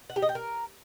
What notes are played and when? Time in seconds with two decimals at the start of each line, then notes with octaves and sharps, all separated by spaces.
0.10 F#5
0.16 G4
0.22 D#5
0.29 G5
0.35 A#4